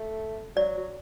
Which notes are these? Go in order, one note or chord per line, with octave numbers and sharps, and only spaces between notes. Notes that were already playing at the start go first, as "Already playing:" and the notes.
Already playing: A3
F#3 D5
F#3